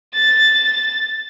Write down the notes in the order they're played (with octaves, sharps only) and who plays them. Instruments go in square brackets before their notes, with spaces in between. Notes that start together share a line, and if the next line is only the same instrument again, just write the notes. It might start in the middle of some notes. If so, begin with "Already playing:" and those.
[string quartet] A6